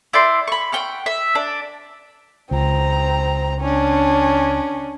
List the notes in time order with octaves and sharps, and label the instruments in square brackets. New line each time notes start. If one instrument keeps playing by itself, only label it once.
[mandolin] E4 D5 G5 C6
B5 C#6
F#5 G5 C#6 F6
E5
D4
[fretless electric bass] C#2 [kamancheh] C4 A#5
[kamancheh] C#4 D4